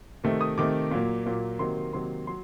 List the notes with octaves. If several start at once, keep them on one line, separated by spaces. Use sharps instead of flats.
C3 D#3 A3
D#6
C3 D#3 A3 D6
A#2 F#3 A#3
A#2 F#3 A#3
C3 D#3 F#3 A#3 C6
C3 D#3 F#3 A#3 C6
F#3 C6